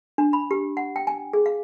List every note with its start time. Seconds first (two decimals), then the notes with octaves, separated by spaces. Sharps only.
0.18 D4
0.33 B5
0.51 G4
0.77 F#5
0.96 G5
1.07 G#5
1.33 G#4
1.46 F5